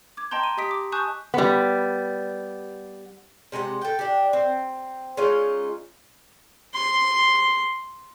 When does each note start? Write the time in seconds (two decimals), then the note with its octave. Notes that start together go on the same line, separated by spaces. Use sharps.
0.17 D6 G#6
0.31 D#5 G5 A5 A#5 C6 G6
0.43 D#7
0.57 G4 D#5 D#6 B6 D7
0.71 D6
0.92 G#5 A5 C#6 D#6 F#6 G6
1.34 G3 B3
3.52 C3 G#3 A4 F#5
3.82 A4 G5
3.99 D4 G4
4.33 C4
5.17 G#3 C#4 D#4 F4
6.74 C6